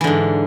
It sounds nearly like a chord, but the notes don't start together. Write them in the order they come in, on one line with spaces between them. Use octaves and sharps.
E3 D3 G#2